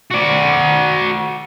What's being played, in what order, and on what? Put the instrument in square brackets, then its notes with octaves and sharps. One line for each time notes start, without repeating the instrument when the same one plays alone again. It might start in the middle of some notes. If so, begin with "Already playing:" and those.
[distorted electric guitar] F#4 D5